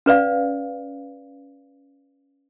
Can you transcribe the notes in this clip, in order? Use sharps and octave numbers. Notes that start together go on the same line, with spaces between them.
C#4 B4 D5 F5